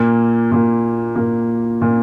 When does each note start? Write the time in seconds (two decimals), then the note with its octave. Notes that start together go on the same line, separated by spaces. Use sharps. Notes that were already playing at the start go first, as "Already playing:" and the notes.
Already playing: A#2 A#3
0.51 A#2 A#3
1.16 A#2 A#3
1.81 A#2 A#3